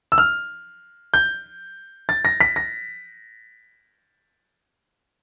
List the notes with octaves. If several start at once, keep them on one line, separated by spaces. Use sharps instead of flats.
E6
F6
G6
A6
A#6
B6
A#6